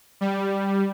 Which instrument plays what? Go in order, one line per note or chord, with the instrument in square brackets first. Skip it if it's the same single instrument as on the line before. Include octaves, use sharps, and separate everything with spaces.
[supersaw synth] G3